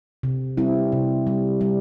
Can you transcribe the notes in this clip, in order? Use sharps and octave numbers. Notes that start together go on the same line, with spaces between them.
C3
G3 C4 E4
C3
G3
G3